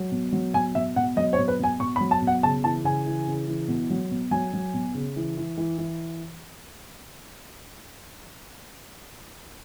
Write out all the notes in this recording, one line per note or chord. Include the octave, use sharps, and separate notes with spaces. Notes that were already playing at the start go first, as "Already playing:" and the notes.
Already playing: F#3
B2
F#3
B2 G#5
B2 E5
B2 F#5
F#3 D#5
C#5
B2
B4
B2 G#5
B2 C#6
B5
F#3
A5
B2
F#5
C#3 A5
E3 A5
C#3 G#5
E3
C#3
E3
B2
F#3
B2
F#3 G#5
F#3
B2
C#3
E3
E3
E3
E3